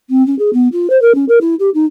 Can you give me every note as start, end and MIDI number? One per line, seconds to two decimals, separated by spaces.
0.10 0.25 60
0.26 0.37 61
0.39 0.50 68
0.53 0.68 59
0.72 0.90 65
0.90 1.00 72
1.02 1.14 70
1.15 1.25 61
1.28 1.38 70
1.41 1.55 64
1.59 1.70 67
1.74 1.85 63